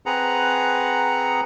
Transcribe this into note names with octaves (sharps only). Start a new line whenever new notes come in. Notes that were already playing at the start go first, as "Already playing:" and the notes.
C4 G#4 B4 F#5 A#5